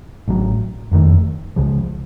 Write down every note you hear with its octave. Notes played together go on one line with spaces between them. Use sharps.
A1 A2 F#3
F#1 F2 D#3 A3
C#2 C#3 F3